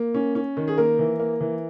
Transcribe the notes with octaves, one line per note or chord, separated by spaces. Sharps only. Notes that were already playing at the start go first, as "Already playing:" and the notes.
Already playing: A#3
C#4
C#4
D#3
G#4
A#3 A#4
E3
A#3
E3